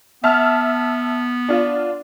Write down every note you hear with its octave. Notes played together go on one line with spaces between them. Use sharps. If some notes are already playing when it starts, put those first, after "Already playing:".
B3 E5 A5 F6
D4 F4